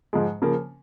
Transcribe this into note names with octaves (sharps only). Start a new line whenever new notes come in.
G#2 F3 G#3
C#3 F3 A#3